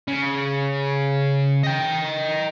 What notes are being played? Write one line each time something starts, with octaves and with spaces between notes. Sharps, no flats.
C#3
D#5 G5